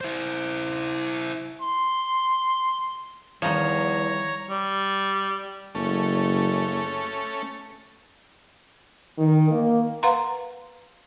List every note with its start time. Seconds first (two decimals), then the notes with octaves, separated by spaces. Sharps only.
0.01 E4 C5
1.61 C6
3.42 E2 D#3 F3 G3 C#5 A#5
4.50 G3
5.75 F#1 A3 C#4
9.19 D#3
9.51 A#3
10.03 B4 F5 F#5 A#5 C6